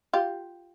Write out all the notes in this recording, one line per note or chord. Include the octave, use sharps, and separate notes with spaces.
F4 G4